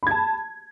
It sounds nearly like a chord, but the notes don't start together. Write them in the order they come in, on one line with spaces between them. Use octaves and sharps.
B5 G#6 A5